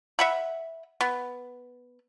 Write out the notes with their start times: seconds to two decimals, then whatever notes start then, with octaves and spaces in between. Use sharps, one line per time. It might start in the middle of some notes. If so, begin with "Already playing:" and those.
0.19 E5 F#5 B5
1.01 B3